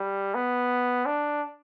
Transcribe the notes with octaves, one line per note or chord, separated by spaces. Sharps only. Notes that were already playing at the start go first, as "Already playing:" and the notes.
Already playing: G3
B3
D4